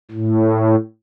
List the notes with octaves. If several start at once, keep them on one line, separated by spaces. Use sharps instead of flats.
A2